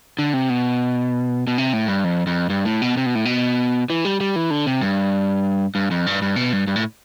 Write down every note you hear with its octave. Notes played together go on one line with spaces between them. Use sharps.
D3
C3
B2
B2
C3
A2
G2
F2
F2
G2
A2
B2
C3
B2
A2
B2
E3
G3
G3
E3
D3
C3
G2
G2
F2
G2
G2
B2
G2
G2
A2